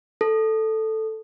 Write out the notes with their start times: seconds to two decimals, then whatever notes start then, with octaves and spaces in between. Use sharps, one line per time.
0.21 A4